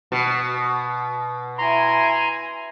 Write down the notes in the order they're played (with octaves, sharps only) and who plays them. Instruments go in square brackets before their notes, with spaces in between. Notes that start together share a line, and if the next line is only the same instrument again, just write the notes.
[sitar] B2
[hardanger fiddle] E4 G#5 [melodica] A#5 C6